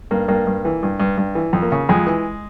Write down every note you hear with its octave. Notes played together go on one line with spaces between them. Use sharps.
G2 A#3
G2 A#3
G2
E3
G2
G2
G2
E3
F2
A#3
C#3
F2 G#3
E3